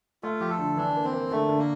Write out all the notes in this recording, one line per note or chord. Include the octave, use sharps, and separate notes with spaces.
A3 F4
F3 G4
A4
D3
E3 D4
A#3
C4
A#3
D3 A3
D3
A#3